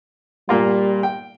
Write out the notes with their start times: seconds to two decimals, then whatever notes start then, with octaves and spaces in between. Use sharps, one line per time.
0.49 A#2 G3 A#3 F4
1.03 G5